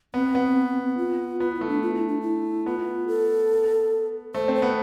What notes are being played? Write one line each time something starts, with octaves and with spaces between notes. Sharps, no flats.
B3 C4
B3
F4
B3 F4
E4
A3
D4
F4
E4
D4
E4
B3 F4
A4
A3 C5
C4
C5
B3